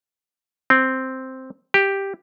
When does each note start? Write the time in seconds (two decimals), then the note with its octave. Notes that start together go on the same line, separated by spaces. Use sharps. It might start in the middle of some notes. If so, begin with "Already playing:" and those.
0.70 C4
1.74 G4